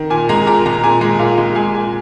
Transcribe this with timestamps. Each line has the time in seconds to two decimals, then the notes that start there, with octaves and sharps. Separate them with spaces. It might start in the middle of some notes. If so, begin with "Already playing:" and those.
Already playing: D#3
0.10 A#2 G#5
0.29 G#3 A#5
0.46 A#2 A#5
0.66 G#3 A#5
0.83 A#2 G#5
1.01 G#3
1.19 A#2 F5
1.38 G#3
1.55 G#3 G#5
1.75 A#2 G#5